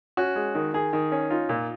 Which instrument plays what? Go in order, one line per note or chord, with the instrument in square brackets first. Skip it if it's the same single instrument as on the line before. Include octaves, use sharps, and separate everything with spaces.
[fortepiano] C#4 F#4
G#3
D#3
D#3 G#4
D#3
C#4
D#4 F4
A#2